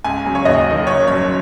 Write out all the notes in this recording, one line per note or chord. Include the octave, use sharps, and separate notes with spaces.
C#2 G#5
C#3 F#3
C#5
D#2 D#5
D#3 F#3
F#1 C#5
F#2 F#3 C#5